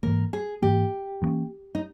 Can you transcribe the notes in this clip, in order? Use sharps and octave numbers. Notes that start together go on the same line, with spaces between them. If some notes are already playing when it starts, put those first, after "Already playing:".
G#2 E3 A#3 A#4
G#4
G#2 E3 A#3 G4
G2 E3 A#3 C#4
D#4